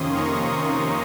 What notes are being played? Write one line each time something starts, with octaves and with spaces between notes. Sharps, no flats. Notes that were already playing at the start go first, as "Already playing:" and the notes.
Already playing: F2 C3 D#3 A#3 C#4 C6 D#6
A#5 C#6
C6 D#6